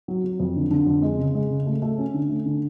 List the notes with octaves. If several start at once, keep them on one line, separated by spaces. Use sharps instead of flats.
F#3
F#3
F2
D3
D3
F2
G#3
C#3
G#3
C#3
A3
A3
C#4
D3
A3
D3